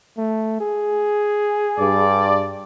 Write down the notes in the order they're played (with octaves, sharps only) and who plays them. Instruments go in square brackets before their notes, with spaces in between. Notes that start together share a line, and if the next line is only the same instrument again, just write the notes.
[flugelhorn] A3
G#4
[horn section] G2 D5